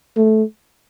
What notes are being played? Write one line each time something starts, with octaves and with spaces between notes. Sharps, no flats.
A3